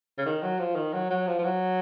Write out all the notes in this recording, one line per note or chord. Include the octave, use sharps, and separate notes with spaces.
C#3
D#3
F#3
F3
D#3
F#3
F#3
F3
F3
F#3